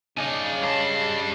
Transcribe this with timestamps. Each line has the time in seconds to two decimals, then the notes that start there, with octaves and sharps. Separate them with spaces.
0.17 C#3 D4 D#4 D#5 G#5
0.62 G3 C#5 D#5 A5 C7